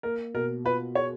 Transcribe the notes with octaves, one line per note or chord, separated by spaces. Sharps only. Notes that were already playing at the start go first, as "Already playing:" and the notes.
A#3 A#4
B2 A#4
F4 B4
G#4 C#5